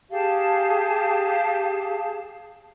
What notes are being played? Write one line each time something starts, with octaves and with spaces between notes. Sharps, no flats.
G4 G#4 F5 A5